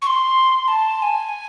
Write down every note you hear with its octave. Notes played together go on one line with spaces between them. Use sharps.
C#6
C6
A5
G#5